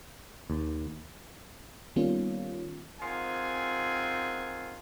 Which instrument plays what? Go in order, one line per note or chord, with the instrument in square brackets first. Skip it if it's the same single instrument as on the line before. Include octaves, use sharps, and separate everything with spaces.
[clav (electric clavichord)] D#2
[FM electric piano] D#3 G3 A#3 B3 C#4 F4
[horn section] D#3 C4 F4 G#4 F#5 G#5